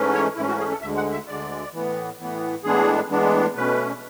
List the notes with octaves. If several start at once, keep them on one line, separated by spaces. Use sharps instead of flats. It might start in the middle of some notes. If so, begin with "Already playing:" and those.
Already playing: G#2 E3 A3 C#4
C#5
G#2 E3 A3 C#4 E4
F#4
G#4
A4
D2 D3 G#3 E5
F#5
E5
D2 D3 G#3 D5
A2 E3 B3
A2 E3 B3
A2 E3 G#3 B3 D4 G#4
A2 E3 G#3 B3 D4
B2 A3 C#4 B4